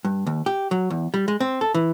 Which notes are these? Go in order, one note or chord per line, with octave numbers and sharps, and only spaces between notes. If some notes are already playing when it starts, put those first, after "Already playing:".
G2
D#2
G4
F#3
E2
G3
G#3
C4
A4
E3